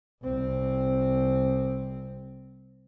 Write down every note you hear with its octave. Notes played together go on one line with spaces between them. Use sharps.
C2 C4